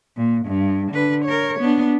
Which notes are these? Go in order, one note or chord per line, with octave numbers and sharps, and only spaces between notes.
A#2
G2
D3 B4
A#4 C#5
B3 D4